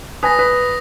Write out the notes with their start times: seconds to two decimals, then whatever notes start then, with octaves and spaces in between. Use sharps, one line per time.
0.23 B4 G#5 D#6 A#6
0.39 B4